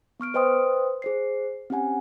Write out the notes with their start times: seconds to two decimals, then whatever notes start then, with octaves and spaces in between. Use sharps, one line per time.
0.20 B3 C#6 F6 D7
0.34 B4 C5 D#5 G5 C6 D#6
1.02 G#4 C5 C7
1.70 C4 C#4 G4 F#5 G#5